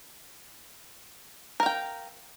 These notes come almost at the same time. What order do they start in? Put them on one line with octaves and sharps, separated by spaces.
A#4 F5 G5